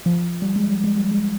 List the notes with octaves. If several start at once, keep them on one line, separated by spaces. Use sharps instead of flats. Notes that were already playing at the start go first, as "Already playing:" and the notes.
F3
G3
G#3
G3
G#3
G3
G#3